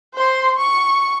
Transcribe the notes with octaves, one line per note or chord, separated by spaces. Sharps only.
C5 C6
C#6